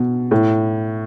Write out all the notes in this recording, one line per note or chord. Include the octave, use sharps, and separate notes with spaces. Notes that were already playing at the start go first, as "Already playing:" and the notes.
Already playing: B2
A2